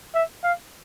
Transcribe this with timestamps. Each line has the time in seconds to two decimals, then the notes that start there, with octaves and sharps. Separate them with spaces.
0.14 E5
0.43 F5